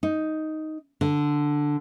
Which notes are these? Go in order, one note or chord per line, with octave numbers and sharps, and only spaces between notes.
D#4
D3